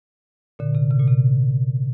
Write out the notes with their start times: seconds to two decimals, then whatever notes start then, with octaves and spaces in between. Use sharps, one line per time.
0.59 A#2 D3
0.75 C3
0.91 C3
1.00 A#2
1.07 C3